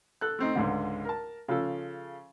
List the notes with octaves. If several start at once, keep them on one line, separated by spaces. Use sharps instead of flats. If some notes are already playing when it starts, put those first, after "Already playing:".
A4 F#6
A3 C4 D#4
C#2 G#2 D3
A#4 A5
C#3 F3 A4